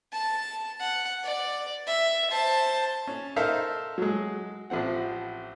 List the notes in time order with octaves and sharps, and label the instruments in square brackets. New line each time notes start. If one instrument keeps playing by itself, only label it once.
[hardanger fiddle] A5
F#5
D5
E5
C5 A5
[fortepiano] C#4
D#4 A4 A#4 C5 E5 F5
F#3 G#3
A1 F3 C4 F#5